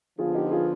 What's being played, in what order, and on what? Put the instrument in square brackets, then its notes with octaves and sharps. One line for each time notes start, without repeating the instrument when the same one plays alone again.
[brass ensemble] D3 F3 B3 [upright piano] F4 G#4
[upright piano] D#4 G4
F4 G#4